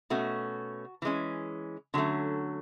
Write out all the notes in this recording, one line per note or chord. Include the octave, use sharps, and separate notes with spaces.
B2 A3 C#4 F#4
E3 G#3 C#4
D3 F#3 A3 C#4